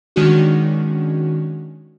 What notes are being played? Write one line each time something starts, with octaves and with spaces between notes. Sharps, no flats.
D#3 G#3 C#4 D4 F#4